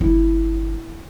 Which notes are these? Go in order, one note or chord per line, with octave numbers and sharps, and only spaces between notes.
G1 E4